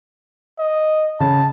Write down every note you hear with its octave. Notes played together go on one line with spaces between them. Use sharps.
D#5
C#3 A5